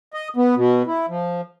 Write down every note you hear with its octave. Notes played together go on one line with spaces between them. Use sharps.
D#5
B3
B2
E4
F3